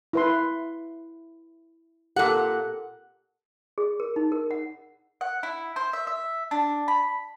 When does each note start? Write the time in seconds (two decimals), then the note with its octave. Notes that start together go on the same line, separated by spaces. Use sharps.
0.13 E4 B4 C6
2.16 A#2 G4 A4 A#4 F#5
3.78 G#4
4.00 A#4
4.16 D#4
4.32 A#4
4.51 F#5
5.21 F#5
5.43 E4
5.76 C5
5.93 E5
6.07 E5
6.51 D4
6.88 B5